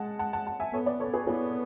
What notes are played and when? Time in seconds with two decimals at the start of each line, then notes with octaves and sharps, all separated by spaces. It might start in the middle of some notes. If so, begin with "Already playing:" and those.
Already playing: G#3 F#5 A5
0.19 F#5 A5
0.33 F#5 A5
0.46 F#5 A5
0.60 E5 G#5
0.73 B3 A4 C#5
0.86 B4 D5
1.00 A4 C#5
1.13 G#4 B4
1.27 B3 E4 G#4